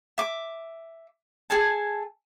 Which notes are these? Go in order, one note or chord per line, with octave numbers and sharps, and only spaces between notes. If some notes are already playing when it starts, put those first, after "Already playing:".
E5 D6
G#4 A4 G#5 A5